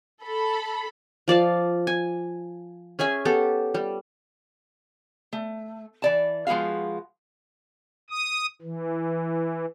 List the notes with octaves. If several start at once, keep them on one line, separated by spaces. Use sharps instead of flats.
A4 B5
F3 D5 F5 A5
G#5
C#4 G#4 E5 G#5
B3 G4 A4
G3
A3
E3 D5 A5
F3 G#3 B3 F#4 F5
D#6
E3